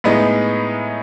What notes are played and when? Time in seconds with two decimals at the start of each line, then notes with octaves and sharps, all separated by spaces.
0.04 A2 G#3 B3 D#4